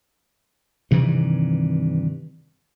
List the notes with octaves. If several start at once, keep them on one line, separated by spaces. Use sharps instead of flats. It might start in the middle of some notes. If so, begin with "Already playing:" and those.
G2 C3 D#3 E3